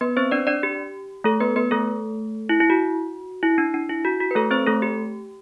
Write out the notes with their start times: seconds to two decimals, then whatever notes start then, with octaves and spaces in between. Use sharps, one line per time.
0.01 B3 B4
0.17 C4 C5
0.31 D4 D5
0.47 D4 D5
0.63 G4
1.24 A3 A4
1.40 B3 B4
1.56 B3 B4
1.71 A3 A4
2.49 E4
2.60 E4
2.70 F#4
3.43 E4
3.58 D4
3.74 D4
3.89 E4
4.05 F#4
4.20 F#4
4.31 B4
4.35 A3 A4
4.51 C4 C5
4.66 A3 A4
4.82 G4